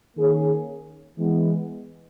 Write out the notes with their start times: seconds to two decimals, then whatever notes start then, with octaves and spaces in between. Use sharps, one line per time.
0.16 D#3 A#3 C#4 G#4 C#5
1.17 E3 G#3 B3